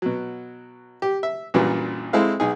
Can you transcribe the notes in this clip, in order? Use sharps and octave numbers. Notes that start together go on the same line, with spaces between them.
B2 F#3
G4
E5
A#1 F#2 A#2 E3 F#3 G3
G#3 C4 E4 A4 F5
B1 D#4 G#4